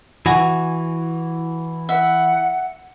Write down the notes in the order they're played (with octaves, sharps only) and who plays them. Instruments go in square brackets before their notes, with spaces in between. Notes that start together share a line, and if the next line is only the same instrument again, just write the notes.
[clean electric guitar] E3 [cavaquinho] F#4 G#5
[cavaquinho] E5 [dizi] F#5